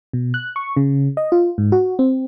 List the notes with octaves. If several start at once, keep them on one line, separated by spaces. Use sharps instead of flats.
B2
F#6
C#6
C#3
D#5
F4
G#2
F#4
C4